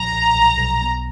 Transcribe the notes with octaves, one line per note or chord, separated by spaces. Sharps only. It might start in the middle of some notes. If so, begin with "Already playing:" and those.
Already playing: B1 A#2 F3 A#5
B1
B1
B1
B3